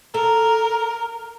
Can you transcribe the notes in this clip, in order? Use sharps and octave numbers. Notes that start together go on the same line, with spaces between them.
A4 A#4